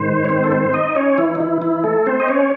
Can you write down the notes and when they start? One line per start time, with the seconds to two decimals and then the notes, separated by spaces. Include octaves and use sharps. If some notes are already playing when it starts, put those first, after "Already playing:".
Already playing: G#2 D#3 C5
0.25 C#5
0.29 C4 C5
0.44 A4
0.51 C4 C5
0.73 D#4 D#5
0.95 C#4 C#5
1.18 E3 E4
1.35 D#4
1.40 E3 E4
1.62 E3 E4
1.84 A3 A4
2.06 C4 C5
2.20 D#5
2.28 C#4 C#5